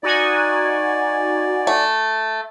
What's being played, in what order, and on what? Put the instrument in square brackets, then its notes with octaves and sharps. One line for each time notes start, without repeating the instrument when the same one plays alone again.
[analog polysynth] D#4 F#4 G#5 [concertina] D5
[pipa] A3